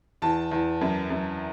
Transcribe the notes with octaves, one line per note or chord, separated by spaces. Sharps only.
E2 A5
E2
F#2
F#2